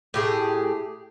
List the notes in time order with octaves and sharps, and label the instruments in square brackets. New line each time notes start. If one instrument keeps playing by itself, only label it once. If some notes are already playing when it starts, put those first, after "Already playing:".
[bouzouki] A2 G4 G#4